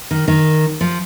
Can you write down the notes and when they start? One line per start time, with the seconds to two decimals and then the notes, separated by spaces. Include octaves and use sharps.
0.11 D#3
0.28 D#3
0.81 F3